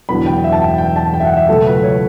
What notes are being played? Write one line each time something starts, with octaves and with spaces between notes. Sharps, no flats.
E1 E2 D3 F#3 B3 B5
G5
E5
A5
G5
G5
A5
G5
E5
F#5
E5
C#2 B2 F#3 A3 A4
B4
C#5